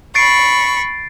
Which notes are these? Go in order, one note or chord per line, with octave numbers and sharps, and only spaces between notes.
B5 C#6 A6 C7 D7